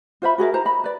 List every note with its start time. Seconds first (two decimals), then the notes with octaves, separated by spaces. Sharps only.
0.22 F4 C5 E5 B5
0.38 F#4 G#4 A#4 E5
0.54 E4 C5 A#5
0.65 D#5 B5
0.84 B4 D5